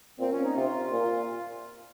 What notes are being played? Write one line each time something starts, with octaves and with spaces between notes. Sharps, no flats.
A#2 C4
C#4
D#4
C3 F4
A#2